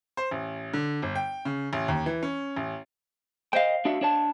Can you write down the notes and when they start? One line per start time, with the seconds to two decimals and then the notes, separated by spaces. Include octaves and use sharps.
0.17 C5
0.31 A1
0.73 D3
1.02 G1
1.15 G5
1.45 C#3
1.73 A1
1.88 D#2
2.06 E3
2.23 C#4
2.56 A1
3.53 C5 D#5 F5 G5
3.85 D4 F#4 E5
4.01 D4 C#5 A5